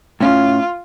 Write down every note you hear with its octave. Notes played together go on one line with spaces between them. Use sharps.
A2 C#4 F4